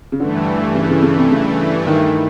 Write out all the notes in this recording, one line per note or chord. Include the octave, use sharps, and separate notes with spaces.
C#3
G2 D3 E3 A3
C#3
C#3
C#3
C3
C#3
D#3